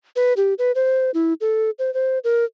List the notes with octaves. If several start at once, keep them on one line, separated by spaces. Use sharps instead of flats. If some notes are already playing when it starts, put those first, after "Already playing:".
B4
G4
B4
C5
E4
A4
C5
C5
A#4